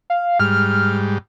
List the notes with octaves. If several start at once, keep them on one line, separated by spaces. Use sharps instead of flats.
F5
G#2 G3 F6